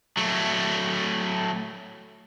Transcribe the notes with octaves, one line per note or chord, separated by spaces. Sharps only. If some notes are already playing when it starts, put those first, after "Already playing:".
F#3 A3